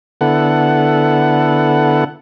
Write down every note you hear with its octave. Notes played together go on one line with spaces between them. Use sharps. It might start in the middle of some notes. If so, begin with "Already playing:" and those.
D3 B3 E4 A4 F#5